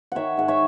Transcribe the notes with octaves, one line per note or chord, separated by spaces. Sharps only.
D#3 C#5 E5 F#5
G#2 F#5
C#5 E5